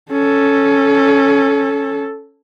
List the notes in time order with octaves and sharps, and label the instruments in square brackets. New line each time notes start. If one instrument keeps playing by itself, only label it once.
[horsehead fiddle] C#4 A4